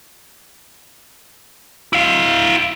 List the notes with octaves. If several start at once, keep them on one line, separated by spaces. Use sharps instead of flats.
E4 F5